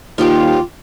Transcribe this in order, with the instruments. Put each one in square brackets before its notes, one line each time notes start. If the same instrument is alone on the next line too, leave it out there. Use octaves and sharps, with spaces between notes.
[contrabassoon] D#2 [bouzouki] F3 G3 G4 [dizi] F4